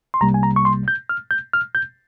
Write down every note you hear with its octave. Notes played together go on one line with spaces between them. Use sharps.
C6
C2 C3 G3 A#3 A#5
G#5
A#5
C#6
C6
G6
F6
G6
F6
G6